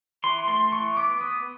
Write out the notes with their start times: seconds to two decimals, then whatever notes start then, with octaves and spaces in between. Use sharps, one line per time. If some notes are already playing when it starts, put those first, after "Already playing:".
0.24 E3 C6
0.47 A3 C6
0.72 E3 C#6
0.97 B3 D6
1.21 B3 D#6